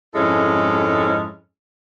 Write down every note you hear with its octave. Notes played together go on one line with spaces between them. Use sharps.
F2 G#2 G#3 C#4 E4 A4